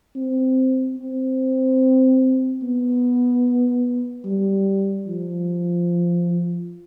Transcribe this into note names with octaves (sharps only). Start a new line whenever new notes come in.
C4
C4
B3
G3
F3